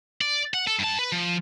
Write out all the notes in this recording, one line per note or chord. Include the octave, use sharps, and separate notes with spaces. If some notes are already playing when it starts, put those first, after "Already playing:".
D5
F#5
A4
G2 A5
B4
F3